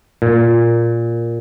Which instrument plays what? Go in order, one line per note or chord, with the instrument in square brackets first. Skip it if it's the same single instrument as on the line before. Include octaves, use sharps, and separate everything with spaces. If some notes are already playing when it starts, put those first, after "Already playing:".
[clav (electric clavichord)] A#2